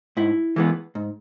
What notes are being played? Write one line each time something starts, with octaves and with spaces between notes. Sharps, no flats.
G#2 E4
E3 G#3 B3
G#2